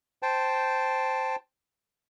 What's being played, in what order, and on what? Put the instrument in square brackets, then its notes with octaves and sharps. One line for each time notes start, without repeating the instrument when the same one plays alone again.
[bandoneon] C5 G5 A5